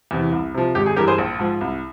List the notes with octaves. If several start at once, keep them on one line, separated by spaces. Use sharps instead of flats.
E2 C3 E3
C2
C3 F3
G#1 G4
G#4
G2 E3 G4 A#4
G#4 C5
A#1
G#2 F3
C2